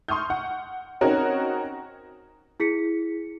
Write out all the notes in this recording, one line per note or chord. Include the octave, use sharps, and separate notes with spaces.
C6 C#6 D#6 F6 G6
F#5
C4 C#4 D#4 F#4 A#4 C#5
E4 G#4 B6 C#7